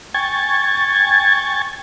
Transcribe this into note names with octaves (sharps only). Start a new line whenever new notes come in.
G5 G#5 C#6 G#6 A6